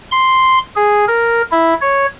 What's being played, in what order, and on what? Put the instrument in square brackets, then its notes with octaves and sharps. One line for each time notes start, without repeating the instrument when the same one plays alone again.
[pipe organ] C6
G#4
A#4
E4
C#5